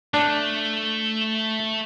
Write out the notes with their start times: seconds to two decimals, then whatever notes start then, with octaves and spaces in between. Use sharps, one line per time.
0.14 A3 D4